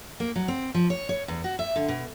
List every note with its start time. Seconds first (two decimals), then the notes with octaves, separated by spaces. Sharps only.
0.20 A#3
0.36 F#3
0.48 C4
0.74 F3
0.90 C#5
1.09 C#5
1.28 E2
1.44 F#4
1.59 E5
1.76 D3
1.88 B2